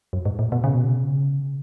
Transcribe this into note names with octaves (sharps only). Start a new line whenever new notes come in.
F#2
G#2
A2
B2
C#3
B2
C#3